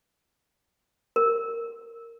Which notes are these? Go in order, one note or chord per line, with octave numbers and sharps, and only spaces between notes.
A#4